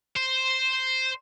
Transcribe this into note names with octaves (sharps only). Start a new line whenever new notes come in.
C5